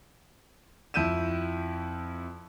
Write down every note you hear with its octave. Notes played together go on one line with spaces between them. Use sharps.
F2 E4 G6 D#7 E7